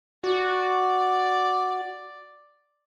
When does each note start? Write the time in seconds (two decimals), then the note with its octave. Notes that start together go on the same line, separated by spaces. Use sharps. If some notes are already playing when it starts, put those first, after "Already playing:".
0.24 F#4 D5